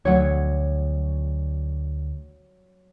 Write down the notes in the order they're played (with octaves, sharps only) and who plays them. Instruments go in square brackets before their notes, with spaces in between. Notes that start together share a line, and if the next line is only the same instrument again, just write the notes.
[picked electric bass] D2 [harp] F#3 C#5